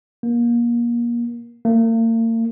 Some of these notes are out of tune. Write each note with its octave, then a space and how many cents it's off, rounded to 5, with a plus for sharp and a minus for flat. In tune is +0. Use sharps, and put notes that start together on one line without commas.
A#3 +30
A#3 -40